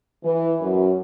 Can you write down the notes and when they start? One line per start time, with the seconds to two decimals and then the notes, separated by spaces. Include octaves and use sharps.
0.24 E3
0.61 F#2